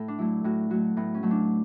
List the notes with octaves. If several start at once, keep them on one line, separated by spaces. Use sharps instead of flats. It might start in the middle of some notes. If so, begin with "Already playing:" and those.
Already playing: A2 A4
D4
F#3 A3 E4
A2 F#4
F#3 A3 F#4
A2 B3
C#4
F#3 A3
D4